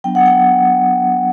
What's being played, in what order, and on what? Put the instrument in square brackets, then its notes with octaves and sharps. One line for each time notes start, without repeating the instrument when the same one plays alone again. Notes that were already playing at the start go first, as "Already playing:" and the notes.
[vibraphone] F#3 B3 D4 G5
F#5
G5